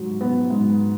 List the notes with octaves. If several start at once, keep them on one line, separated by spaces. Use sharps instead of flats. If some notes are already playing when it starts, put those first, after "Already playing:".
Already playing: G#2 F#3
B3
G#2